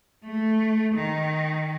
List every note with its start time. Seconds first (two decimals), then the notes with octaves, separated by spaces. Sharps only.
0.25 A3
0.95 D#3